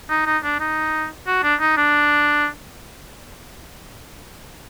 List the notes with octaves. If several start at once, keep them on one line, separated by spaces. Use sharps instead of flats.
D#4
D#4
D4
D#4
F#4
D4
D#4
D4